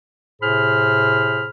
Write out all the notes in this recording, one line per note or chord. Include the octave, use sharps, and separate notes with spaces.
A2 C3 G#4 C5 B5 F6